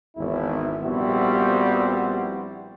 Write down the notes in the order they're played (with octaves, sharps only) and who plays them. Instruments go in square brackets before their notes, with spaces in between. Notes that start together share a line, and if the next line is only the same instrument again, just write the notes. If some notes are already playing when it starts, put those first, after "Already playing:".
[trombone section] G#1 E2 E4
A#1 G3 B3 C4 E4 F#4